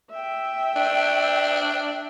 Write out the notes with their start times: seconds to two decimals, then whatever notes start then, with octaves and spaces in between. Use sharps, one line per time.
0.11 E5 G5
0.76 D4